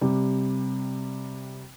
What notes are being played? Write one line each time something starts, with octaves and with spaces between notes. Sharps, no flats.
C3 G3